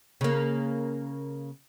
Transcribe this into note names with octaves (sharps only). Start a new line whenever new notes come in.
C#3 A#3